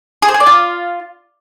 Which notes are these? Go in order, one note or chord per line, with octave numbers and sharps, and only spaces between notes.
G#4
C5
G#4
D5
F4